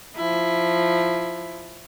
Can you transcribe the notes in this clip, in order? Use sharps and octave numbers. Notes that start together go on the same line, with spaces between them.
F3 E4